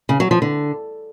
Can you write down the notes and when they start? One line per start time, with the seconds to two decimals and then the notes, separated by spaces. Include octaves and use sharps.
0.09 C#3
0.20 F#3
0.31 F3
0.42 D3